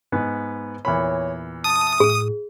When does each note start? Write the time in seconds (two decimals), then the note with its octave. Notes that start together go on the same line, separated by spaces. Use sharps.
0.12 G#2 B3 B4
0.85 E2 A#2 C#5 B5
1.64 A5 D#6
2.00 A2 G#4